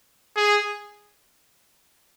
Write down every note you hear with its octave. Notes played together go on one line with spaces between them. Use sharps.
G#4